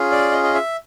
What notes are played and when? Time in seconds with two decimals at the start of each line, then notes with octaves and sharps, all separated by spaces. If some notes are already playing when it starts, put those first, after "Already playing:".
Already playing: C#4 F4 G#4
0.12 D5
0.32 D#5
0.43 D#5
0.54 E5